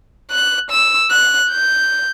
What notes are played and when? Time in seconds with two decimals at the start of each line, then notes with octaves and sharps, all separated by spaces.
0.31 F#6
0.70 E6
1.10 F#6
1.50 G6